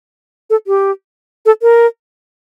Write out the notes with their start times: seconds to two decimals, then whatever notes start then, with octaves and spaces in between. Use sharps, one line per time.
0.50 A4
0.67 G4
1.46 A4
1.62 A#4